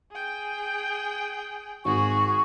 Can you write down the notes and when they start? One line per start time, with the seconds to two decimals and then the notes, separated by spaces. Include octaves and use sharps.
0.11 G#4 G5
1.85 G#1 F#4 G#4 C#6